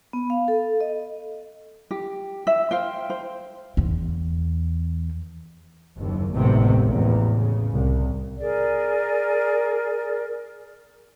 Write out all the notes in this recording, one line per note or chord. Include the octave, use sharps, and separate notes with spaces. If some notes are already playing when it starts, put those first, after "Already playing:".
B3
F5
A4
D#5
G4
E5
C5 F5 G5
C5
E2
F#1 D#2
G#1 D#2 A2 C3 D#3 B3
A1 E2
C#3
C2
G#4 A#4 D5